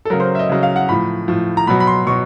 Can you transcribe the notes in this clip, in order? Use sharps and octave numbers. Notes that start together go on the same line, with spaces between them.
A4
C#3 F#3 A#4
C5
E5
D#5
C#3 F#3
F5
F#5
A2 F3 B5
A2 F3
A#5
B2 F#3 B5
B5
C6
B2 F#3 C#6